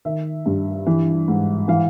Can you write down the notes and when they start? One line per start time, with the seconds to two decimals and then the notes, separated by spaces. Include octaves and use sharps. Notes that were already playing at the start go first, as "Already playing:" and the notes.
0.05 D#3 E5
0.46 G2
0.86 E3
1.28 G#2
1.68 E3 F5